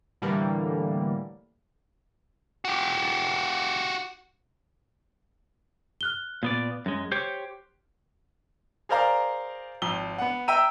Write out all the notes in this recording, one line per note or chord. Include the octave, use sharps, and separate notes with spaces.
A2 D3 E3 G3 A#3
F#4 G4
F6 F#6 G7
A#2 B3 D5
F#2 G#3
G4 C5 C#5
G#4 A#4 C5 D5 F5 A#5
G#1 F3 G7
B3 F#5
E5 G5 A#5 E6 D#7